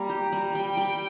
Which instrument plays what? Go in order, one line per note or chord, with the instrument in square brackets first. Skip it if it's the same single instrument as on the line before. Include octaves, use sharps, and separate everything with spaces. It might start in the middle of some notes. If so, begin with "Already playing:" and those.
Already playing: [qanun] G3 A#3 [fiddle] A#5
[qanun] G4
G3
[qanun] G3 [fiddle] G5
[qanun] G3